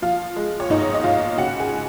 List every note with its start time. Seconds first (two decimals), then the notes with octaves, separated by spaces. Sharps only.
0.02 F3 F4 F5
0.36 G#3
0.60 C#5
0.70 G#2 D#4 D#5
0.94 D#5
1.03 G#2 F4 F5
1.38 C#3 F#4 F#5
1.60 G#4 G#5
1.72 G#3